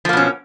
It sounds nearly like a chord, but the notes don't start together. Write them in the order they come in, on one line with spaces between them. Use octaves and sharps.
F3 A#3 B2 C#4